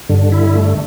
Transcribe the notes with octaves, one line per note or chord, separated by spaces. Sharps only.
G2 D3
E4
A3